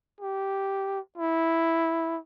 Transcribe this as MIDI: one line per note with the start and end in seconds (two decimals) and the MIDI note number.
0.21 1.00 67
1.18 2.18 64